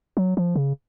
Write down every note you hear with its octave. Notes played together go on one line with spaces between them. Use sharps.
F#3
F3
C#3